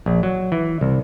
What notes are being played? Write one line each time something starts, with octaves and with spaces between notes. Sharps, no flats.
A#1
F#3
E3
C2